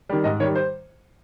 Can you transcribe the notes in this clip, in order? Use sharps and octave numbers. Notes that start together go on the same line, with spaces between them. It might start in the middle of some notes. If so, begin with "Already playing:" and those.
D#3 G3
G#2 D#5
D#3 G3 C#5
C5